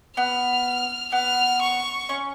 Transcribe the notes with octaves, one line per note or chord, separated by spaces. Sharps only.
B3 F6
B3 F6
C#6
C#4